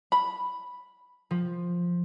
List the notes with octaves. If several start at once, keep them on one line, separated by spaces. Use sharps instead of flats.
B5
F3